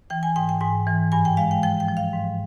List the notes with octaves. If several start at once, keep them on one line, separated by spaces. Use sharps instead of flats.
E3 G5
G#5
G#2 G5
G5
G#2 G#5
E3
G2 G#5
G5
G#3 F5
G5
F3 G5
G5
F3
F5
G#2